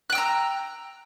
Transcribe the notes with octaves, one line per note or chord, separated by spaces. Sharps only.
G5 A#5 E6 F#6